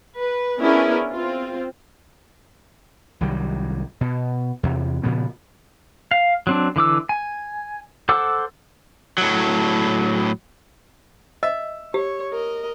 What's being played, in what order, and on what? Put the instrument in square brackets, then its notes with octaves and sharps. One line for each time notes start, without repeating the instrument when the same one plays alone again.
[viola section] B4
B3 C#4 D4 E4 G#4 A#4
C4 F4
[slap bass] C2 D#3 F#3 G3
B2
E2 C3
A#2 C#3 F3 B3
[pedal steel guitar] F5
F#3 C4 D4
D3 E3 D6 E6
G#5
A4 C5 F#5 D6 E6
[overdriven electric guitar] A2 F#3
[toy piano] D#5 [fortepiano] E5
[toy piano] G4 [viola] C#5
[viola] A#4 D#5